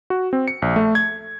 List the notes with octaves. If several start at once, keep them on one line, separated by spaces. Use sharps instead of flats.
F#4
C4
C#7
A#1
A3
G#6